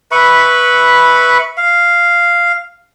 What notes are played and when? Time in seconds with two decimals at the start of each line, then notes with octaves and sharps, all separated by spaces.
0.12 B4 E5 B5 C#6
1.57 F5